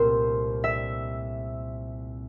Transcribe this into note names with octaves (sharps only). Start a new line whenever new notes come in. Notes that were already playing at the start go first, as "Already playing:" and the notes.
Already playing: C2 A#2 A3 C4 A#4 C5
E5